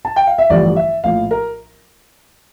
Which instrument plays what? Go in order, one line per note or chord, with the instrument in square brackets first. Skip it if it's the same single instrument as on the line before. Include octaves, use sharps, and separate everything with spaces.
[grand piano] A5
G5
F5
E5
A1 G2 D3 F3 D5
E5
A#1 A2 F3 F5
A#4